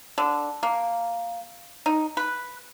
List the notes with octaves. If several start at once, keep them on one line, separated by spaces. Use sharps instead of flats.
D3
A#3
D#4
B4